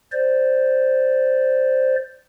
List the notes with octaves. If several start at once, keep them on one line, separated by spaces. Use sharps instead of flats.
C5 D5